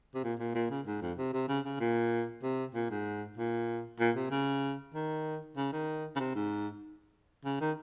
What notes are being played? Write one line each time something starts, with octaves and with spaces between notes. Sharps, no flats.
C3
A#2
A#2
A#2
C#3
G#2
F2
C3
C3
C#3
C#3
A#2
C3
A#2
G#2
A#2
A#2
C3
C#3
D#3
C#3
D#3
C#3
C3
G#2
C#3
D#3